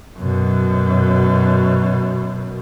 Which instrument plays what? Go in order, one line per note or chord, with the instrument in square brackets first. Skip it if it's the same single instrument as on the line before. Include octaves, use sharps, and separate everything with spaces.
[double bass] F#2 B2